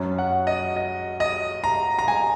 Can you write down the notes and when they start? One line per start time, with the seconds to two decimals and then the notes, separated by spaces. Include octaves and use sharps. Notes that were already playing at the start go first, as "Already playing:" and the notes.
Already playing: F#2 F#3 C#4
0.18 F#5
0.47 D#5
0.76 D#5
1.20 D#5
1.64 A#5
1.99 A#5
2.08 G#5